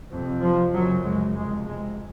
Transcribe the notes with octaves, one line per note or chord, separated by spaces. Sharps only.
F2 C3
F3
F#2 C#3 F#3
G#3
F2 C3 G#3
G#3